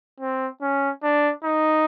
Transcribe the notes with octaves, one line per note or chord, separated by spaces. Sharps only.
C4
C#4
D4
D#4